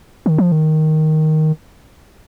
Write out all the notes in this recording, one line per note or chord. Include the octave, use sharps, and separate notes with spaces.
D#3
F3
D#3